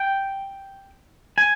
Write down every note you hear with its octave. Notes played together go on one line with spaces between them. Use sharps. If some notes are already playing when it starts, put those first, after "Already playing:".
Already playing: G5
G#5